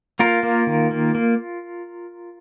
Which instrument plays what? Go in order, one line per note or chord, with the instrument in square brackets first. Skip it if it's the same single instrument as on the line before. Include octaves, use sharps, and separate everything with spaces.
[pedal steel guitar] A#3 F4 A#4
A#3
D#3
A#3
A#3